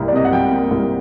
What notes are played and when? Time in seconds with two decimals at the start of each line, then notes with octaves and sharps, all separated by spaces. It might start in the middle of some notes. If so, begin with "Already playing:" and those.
Already playing: C2 G3 A#3
0.08 D5
0.13 C3 D#5
0.25 F#5
0.33 G3 G5
0.51 A#3
0.70 C2